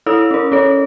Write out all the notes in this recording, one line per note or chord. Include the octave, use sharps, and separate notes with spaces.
E4 A4 C#5 D#6 E6
C#4 A#4
C#4 A4 C#5